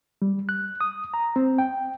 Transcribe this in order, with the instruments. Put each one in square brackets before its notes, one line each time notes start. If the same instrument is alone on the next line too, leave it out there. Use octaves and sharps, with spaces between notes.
[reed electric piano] G3
F#6
D#6
A#5
C4
G5